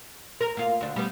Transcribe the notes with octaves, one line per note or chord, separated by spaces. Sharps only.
A#4
A#3 F4
D2 D4
G3 B3